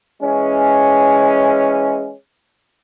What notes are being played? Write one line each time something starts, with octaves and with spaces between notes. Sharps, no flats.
E3 G#3 C#4